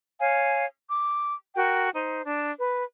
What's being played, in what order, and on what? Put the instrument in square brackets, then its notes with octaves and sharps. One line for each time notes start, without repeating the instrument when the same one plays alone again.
[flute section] C#5 F5 G#5
D6
F#4 A#4 G5
D#4 C5
D4
B4